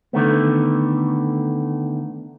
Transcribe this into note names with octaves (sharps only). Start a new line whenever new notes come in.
D3 D#3 A3 B3